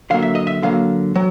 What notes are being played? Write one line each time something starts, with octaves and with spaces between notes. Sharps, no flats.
D3 F#3 A#3 F5
E5
D#5
E5
D3 F#3 A#3 F5
F#3